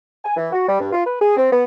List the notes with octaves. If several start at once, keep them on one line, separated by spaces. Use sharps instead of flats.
G#5
E3
F#4
G3
G2
F4
B4
G#4
C4
B3